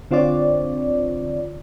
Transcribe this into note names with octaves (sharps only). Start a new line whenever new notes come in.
D3 C4 F4 C#5 D5